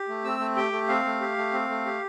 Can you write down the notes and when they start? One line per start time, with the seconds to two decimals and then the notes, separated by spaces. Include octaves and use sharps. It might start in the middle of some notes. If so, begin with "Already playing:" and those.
Already playing: G4
0.09 A3
0.24 C4 E6
0.40 A3
0.57 G4 G5
0.73 A3
0.89 C4 F5
1.05 A3
1.21 G4
1.37 A3
1.53 C4
1.70 A3
1.86 G4